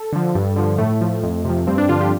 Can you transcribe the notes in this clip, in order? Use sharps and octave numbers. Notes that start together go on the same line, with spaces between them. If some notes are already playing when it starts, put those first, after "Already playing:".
Already playing: A4
D3 F3
G2
D3 F3
A2 A3
F3
F2
C3 F3
G2 C4
D4
D3 F3 F4
G4